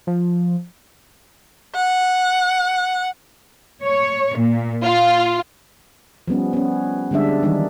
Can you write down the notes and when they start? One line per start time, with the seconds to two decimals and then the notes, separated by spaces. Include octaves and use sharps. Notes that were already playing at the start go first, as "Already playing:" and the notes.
0.07 F3
1.75 F#5
3.84 C#5
4.38 A#2
4.83 F4
6.28 F3 G3 B3 C#4
6.53 B3 C#4
7.11 D3 G3 G#3 D4 E5
7.43 D#3 E3 G3 D4 D#4